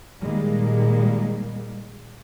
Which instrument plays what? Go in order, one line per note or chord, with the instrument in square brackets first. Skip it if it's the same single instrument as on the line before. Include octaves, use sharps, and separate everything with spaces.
[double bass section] A#2 D#3 G3 G#3 A#3